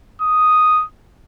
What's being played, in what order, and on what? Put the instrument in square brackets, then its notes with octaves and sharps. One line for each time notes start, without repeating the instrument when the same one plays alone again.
[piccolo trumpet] D#6